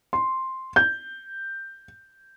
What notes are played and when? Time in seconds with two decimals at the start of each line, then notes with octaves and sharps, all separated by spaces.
0.13 C6
0.76 G6